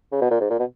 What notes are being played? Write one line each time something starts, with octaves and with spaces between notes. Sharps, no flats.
C#3
B2
A#2
G#2
A#2
B2